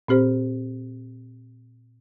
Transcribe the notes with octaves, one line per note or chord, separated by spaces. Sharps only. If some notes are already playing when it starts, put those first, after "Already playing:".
A#2 C4 G4 C5